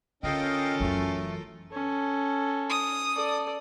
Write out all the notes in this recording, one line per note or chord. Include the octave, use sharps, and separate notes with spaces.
D3 C#4 F4 A4 A#4 D#5 F5 G5
F#2 E3 A3
C#4 A4
D#6
A4 D5